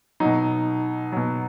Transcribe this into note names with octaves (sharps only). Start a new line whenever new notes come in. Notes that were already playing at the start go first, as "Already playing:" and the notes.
F#3 D#4
B2
B2 F#3